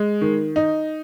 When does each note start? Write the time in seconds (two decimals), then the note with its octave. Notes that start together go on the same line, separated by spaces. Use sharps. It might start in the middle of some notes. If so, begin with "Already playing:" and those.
Already playing: G#3
0.21 D#3
0.56 D#4